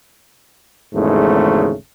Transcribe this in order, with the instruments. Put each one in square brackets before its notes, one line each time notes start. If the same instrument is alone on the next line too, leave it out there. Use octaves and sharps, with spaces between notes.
[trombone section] G#1 E2 G#2 C#3 A3